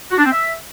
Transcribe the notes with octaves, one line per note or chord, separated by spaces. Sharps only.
F#4
D4
C4
E5